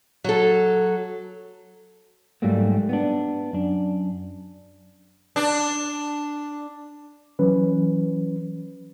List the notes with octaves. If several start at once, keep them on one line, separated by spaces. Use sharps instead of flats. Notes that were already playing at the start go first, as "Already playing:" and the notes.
F#3 A4
G#2 F#3 G3 A3 A#3
B3 D4
F#2 D4
D4
E3 F#3 C#4 B4